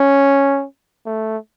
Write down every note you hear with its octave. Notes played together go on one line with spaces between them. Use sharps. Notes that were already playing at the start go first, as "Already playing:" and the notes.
Already playing: C#4
A3